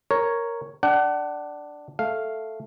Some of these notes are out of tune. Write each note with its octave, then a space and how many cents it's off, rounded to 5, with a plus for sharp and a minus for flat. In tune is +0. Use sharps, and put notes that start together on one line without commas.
A#4 +0 C#5 +0
D4 +0 F#5 +30
A3 +0 F5 +0